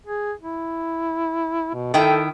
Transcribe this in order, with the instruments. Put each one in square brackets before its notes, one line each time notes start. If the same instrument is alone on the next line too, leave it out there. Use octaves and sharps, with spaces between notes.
[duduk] G#4
E4
B2
[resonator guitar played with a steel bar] D#3 E4 G5 [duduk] A4